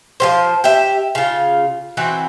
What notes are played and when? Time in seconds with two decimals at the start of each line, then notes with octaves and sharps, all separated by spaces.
0.20 F3 G3 C5
0.64 G4 E5
1.15 C#3 F4
1.97 E3 C4 F#4